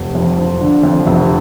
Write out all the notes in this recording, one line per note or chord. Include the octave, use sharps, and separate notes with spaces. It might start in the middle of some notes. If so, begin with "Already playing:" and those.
Already playing: F1
F2
F3
D3
F2
F1